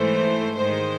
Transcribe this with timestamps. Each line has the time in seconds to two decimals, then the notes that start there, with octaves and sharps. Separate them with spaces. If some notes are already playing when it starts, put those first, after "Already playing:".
Already playing: G#2 E3 A3 C5
0.56 G#2 D#3 G#3 C5